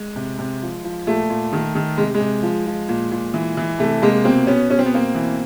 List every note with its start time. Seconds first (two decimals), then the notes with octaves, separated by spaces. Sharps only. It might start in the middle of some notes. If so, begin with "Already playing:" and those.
Already playing: G#3
0.16 C3
0.39 C3
0.63 F3
0.84 F3
1.07 A#2 A3
1.30 A#2
1.53 D#3
1.75 D#3
1.98 C3 G#3
2.14 G#3
2.20 C3
2.43 F3
2.67 F3
2.89 A#2
3.11 A#2
3.34 E3
3.57 E3
3.79 C3 A3
4.02 C3 G#3 A#3
4.24 B2 A#3 C4
4.47 B2 B3 C#4
4.69 B2 C#4
4.79 C4
4.86 B3
4.92 B2 A#3 C4
5.15 E3